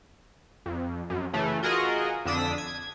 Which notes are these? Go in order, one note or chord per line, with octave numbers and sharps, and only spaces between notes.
F2
F#2
C#3 E3 A3
F4 F#4 G#4 A#4 D#5
F2 D3 D4 D#6 E6 B6
G#6